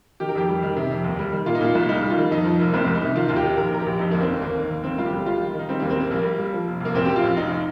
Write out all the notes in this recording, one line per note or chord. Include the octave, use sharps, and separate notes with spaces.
D#3 G4
A#4
F2 G4
G3
D#3
C3
F2
D#2
G3
D#3
A#2 F4
D#4
A#2 F4
C2
G3 D#4
G3
F4
D#3
F2 D#4
F3
F1 A#3
C2 C4
C2
D#4
C3
D#3 F4
D#2 F4
G4
D#3
A#1 A#4
A#1 A#4
G4
A#1
F2 D#4
G1 A#3
C4
G1
D#2 A#3
D#3
D#2
G1 C4
G2 F4
G4
G1
G3 F4
D#3
D#3 D#4
G3 C4
D#2 A#3
C4
G3 A#3
A#1 A#3
G3
G3
F3
F1
F1 A#3
A#1 C4
A#1 G4
F4
A#1
F1 D#4